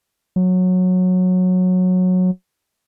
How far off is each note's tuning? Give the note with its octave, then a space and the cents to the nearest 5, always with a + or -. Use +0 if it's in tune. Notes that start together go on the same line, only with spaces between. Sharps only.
F#3 -15